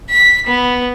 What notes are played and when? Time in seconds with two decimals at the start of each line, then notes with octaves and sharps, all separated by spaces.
0.10 B6
0.47 B3